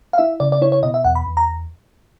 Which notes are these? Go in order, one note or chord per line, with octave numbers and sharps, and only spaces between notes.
F5
E4 E5
C#3 D5
D5
E4 C#5
C#5
B2 D#5
E5
E2 F#5
B5
E2
A#5